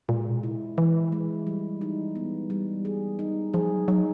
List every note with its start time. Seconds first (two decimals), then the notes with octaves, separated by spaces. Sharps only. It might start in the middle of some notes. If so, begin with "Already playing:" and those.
0.09 A#2 G#3
0.27 B2
0.43 C3 E4
0.77 E3 E4
1.12 G#3
1.47 G3
1.81 D#4
2.15 B3
2.50 G3
2.85 G#4
3.19 D#4
3.54 F3 G#4
3.71 F#3
3.88 F#3 D#4